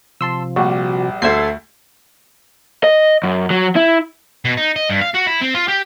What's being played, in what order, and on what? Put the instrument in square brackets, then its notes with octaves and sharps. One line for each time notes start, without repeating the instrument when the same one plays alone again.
[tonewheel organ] C3 F3 [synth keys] A5 C6 E6
[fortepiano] A#1 G3 [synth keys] F#4
[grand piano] D2 A3 [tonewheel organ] A5 [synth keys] E6 G#6 C7
[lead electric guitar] D#5
F#2
F#3
E4
[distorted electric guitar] B2
D#4
D#5
G2
F5
F#4
E4
C4
F4
G4